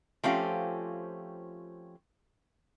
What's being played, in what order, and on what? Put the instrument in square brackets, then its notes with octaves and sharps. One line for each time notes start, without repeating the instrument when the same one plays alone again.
[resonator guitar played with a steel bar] F3 A3 C4 C#4 F4 G4